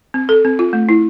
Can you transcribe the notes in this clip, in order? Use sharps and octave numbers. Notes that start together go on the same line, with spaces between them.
C4
A4
C4
F4
A3
E4